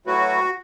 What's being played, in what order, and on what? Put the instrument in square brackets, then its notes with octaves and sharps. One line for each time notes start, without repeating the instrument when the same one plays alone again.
[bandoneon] A2 F#3 A3 E4 B4 [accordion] F#4